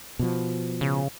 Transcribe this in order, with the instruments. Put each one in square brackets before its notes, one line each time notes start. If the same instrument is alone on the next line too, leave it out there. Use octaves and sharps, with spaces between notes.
[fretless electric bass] B2 F3
[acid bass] C#3